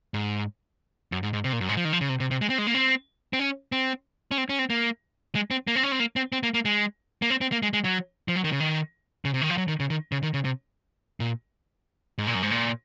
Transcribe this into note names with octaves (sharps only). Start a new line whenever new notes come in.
G#2
F#2
G#2
G#2
C3
A#2
F#2
G#2
F3
D#3
F3
C#3
C3
C3
C3
G#3
C4
G#3
A#3
C4
C4
C#4
C4
C#4
C4
C#4
C4
A#3
G#3
C4
A#3
C4
C#4
C4
A#3
C4
C4
A#3
A#3
G#3
A#3
C4
C4
A#3
G#3
G#3
F#3
F3
F#3
D#3
C#3
D#3
C#3
C3
D#3
F3
F#3
D#3
C#3
D#3
C#3
D#3
C#3
C3
A#2
G#2
A#2
F#2
G#2
A#2